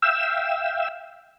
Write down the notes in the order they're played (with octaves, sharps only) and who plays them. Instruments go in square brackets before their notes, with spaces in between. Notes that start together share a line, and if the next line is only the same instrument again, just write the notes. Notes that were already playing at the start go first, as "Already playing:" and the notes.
[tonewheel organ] E5 F5 G5 E6